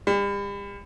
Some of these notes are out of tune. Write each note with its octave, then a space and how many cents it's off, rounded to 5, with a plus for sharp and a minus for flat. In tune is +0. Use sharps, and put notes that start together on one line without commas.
G3 +40